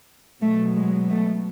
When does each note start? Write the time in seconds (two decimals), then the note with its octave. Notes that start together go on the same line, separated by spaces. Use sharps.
0.42 B2 F#3 A3
0.76 G#3
1.10 A3